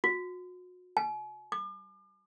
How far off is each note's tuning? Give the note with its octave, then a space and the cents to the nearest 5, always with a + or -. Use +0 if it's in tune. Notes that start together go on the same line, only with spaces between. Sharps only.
F#4 -35
G#5 +40
D6 +40